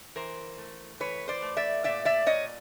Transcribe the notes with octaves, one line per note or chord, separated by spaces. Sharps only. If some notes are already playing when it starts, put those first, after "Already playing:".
E3 A#4 C5
A3
E3 B4 C#5
C5 D5
A3
D5 E5
A#2 D5 E5
D5 E5
A#2 C#5 D#5